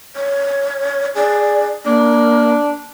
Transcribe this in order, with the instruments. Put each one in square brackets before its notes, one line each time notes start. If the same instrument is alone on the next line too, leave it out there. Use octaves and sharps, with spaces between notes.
[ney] C#5
[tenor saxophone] G#4 [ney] D5
[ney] A#3 [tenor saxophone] D4